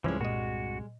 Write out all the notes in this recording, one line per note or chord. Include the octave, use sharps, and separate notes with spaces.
C2 G2 C3 E3 F3 G3 G#3 C#4
A#2 F#4 D#5